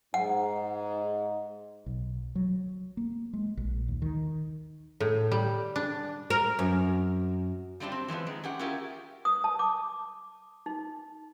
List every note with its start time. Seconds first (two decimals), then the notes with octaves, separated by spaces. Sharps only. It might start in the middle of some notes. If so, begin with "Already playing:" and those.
0.14 G#2 F#5
1.86 B1
2.35 F#3
2.97 A#3
3.33 G#3
3.57 A#1
3.88 D#2
4.02 D#3
5.00 A2
5.32 G3
5.76 D4
6.30 A#4
6.59 F#2
7.80 G3 A3 C4 D4 F4 G4
7.92 C4
8.08 E3 F3 G#3 B3
8.27 D#3 G#3
8.44 C#4 G4 F#5
8.59 C#4 E4 F4 G4 G#4 A#4
9.25 D#6
9.44 A5
9.59 D6
10.66 D#4